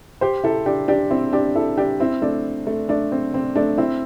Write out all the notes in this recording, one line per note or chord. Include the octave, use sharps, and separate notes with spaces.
G4 C5
E4 A4
D4 G4
D4 G4
C4 E4
D4 G4
E4 A4
D4 G4
C4 E4
A3 D4
A3
A3 D4
C4
C4
A3 D4
C4 E4